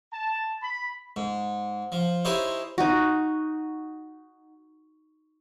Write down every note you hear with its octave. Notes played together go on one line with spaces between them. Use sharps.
A5
B5
G#2
F3
D#4 E4 G4 G#4 C5 C#5
D#4 F#4